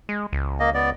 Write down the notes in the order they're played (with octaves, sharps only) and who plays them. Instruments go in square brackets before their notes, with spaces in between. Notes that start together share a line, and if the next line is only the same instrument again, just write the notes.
[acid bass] G#3
C#2
[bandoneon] A#3 D#5
B3 D5